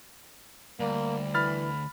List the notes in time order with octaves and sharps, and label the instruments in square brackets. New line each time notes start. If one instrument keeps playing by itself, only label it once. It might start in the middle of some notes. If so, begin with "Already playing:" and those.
[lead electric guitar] D2 [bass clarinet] G3 [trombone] A#3
[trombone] E3 [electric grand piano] B5 F6 A6